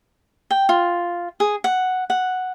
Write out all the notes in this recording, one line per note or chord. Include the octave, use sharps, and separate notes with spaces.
G5
F4
G#4
F#5
F#5